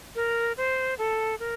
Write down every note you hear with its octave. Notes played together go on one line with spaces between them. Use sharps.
A#4
C5
A4
A#4